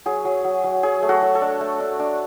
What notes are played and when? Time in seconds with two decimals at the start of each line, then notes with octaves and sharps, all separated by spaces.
0.06 F#3 G#4
0.25 F#3
0.45 F#3
0.64 F#3
0.83 F#3 G#4
1.03 A3
1.09 F#4 A4
1.22 F#3
1.35 A4 C#5
1.41 D4
1.61 A3
1.80 D4
2.00 D4